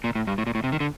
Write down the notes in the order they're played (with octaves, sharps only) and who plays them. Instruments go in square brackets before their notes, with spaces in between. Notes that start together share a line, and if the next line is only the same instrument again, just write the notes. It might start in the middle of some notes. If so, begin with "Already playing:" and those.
[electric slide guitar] A#2
A2
G2
A2
A#2
A2
C3
D#3
D3